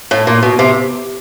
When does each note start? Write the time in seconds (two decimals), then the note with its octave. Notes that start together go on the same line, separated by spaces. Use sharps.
0.11 A2
0.27 A#2
0.43 B2
0.59 C3